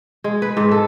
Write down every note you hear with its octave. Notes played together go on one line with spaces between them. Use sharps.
G#3
B4
G#2
A4